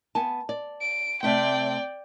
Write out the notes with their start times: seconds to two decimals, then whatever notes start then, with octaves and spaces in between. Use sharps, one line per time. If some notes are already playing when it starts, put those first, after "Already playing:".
0.15 B3 G#5 A5
0.49 D5
0.82 D7
1.23 C3 A3 C4 D5 G5